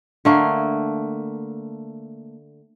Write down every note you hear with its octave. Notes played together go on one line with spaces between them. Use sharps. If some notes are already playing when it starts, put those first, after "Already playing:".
D3 A3 A#3